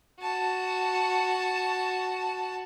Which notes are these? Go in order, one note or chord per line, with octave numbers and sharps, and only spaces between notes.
F#4 A5